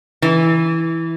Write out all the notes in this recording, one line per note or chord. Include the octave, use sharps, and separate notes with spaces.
E3